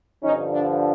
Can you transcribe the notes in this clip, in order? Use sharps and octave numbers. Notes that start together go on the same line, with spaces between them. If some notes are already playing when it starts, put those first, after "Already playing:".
G2 D3 F3 C#4 D#4
D4